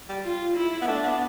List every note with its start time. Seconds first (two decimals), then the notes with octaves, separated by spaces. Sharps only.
0.09 G3
0.24 F4
0.56 E4
0.82 B3
0.87 A3 D4
1.03 B3